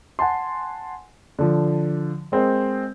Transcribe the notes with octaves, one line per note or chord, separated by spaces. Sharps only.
F#5 G#5 A5 C6
D3 F3
G#3 C4 A#4 C5